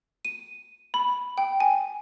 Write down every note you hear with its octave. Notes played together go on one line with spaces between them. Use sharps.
D#7
B5
G5
G#5